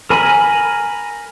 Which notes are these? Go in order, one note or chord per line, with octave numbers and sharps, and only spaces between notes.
A#4 G#5 B5